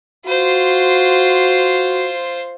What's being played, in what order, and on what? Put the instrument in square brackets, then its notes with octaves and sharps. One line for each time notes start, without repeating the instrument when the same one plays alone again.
[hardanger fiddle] F4 C5 [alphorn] F#4